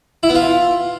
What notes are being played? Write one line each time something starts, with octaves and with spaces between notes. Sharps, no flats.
E4
B3
F4